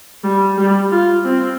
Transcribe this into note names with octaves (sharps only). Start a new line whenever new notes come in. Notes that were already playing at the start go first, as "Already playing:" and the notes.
G3
G3
F4
C4